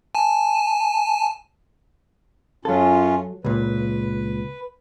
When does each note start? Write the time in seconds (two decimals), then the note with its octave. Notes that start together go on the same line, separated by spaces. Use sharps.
0.15 G#5 A5
2.65 F#2 F#3 C#4 F4 A4
3.44 C#2 A#2 B4